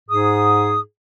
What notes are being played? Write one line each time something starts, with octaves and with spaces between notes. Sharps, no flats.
G#2 G#4 D#6